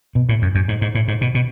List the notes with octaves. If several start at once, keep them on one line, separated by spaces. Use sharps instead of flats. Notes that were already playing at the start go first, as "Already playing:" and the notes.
B2
A2
F#2
F#2
G#2
G#2
A2
G#2
B2
B2